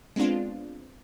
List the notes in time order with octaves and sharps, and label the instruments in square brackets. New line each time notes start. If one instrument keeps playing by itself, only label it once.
[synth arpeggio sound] G#3 B3 C4 D4 F4